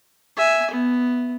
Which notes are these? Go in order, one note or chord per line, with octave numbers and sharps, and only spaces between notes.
E5 G#5
B3